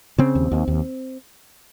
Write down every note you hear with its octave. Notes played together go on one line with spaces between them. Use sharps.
C#3 C4
D#2
D#2
D#2